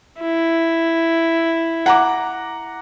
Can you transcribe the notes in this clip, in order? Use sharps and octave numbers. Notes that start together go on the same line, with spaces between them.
E4
F#5 A#5 D6